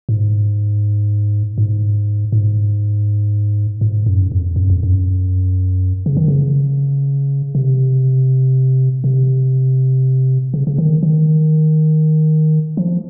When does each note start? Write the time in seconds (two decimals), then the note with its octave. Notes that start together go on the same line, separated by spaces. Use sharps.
0.09 G#2
1.58 G#2
2.32 G#2
3.81 G#2
4.06 F#2
4.32 F2
4.56 F#2
4.70 F2
4.83 F#2
6.06 C#3
6.17 D#3
6.28 C#3
7.55 C3
9.04 C3
10.54 C#3
10.67 C#3
10.78 D#3
11.03 D#3
12.77 F3